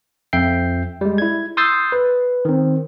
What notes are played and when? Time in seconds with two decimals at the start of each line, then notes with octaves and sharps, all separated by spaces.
0.33 F2 E5 G5 G6 C7
1.01 G3 G#3
1.18 E4 G#6
1.57 C6 D#6 E6 G6 A6 C7
1.92 B4
2.45 D#3 C4